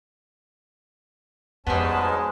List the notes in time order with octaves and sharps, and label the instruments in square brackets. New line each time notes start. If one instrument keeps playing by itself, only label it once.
[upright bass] F2 [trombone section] G#2 B2 G#3 [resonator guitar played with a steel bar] G3 B3 [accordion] C#4 A5